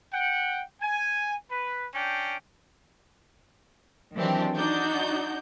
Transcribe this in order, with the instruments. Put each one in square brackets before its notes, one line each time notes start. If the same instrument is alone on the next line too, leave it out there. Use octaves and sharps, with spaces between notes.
[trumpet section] F#5 G5
G#5
B4
C#4 D4 G5
[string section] D#3 E3 F#3 C4 D4 G4
D4 D#4 F#4 G6